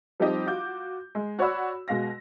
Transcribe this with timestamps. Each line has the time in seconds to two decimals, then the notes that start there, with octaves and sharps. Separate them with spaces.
0.20 F3 G3 C4 D#4 G4 D#5
0.47 F4 F#4 D6 G6
1.15 G#3
1.39 F#4 C#5 D5 F#5 B5 E6
1.88 B2 G#3 F5 A#6